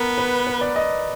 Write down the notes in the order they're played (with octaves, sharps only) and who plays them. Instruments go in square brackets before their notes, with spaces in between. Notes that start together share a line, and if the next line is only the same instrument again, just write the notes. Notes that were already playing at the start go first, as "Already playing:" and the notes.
Already playing: [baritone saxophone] B3 [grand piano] A#4
[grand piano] B4
B4
D5
D#5